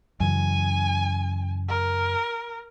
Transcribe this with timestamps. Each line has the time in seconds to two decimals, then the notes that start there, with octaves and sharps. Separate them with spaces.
0.20 F#2 C#3 E3 G#5
1.69 A#4